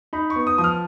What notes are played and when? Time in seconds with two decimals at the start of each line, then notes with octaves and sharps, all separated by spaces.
0.13 D#4 B5
0.30 C#6
0.36 B3
0.47 D#6
0.58 F3 D#6
0.64 F6